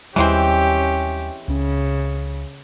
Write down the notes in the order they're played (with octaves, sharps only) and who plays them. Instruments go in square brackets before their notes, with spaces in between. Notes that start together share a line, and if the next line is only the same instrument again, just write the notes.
[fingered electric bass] D#2 G3 [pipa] E3 G#3 C4 [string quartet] C#4 G4
[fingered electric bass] C#2 C#4 [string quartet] C#3